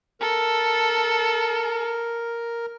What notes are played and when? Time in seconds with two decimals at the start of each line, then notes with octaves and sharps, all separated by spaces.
0.21 A4 A#4